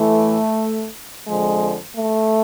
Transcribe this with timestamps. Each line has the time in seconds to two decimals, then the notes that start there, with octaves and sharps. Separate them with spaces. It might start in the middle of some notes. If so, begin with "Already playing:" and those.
Already playing: A2 E3 A3
1.27 F2 D3 F3 G#3
1.97 A3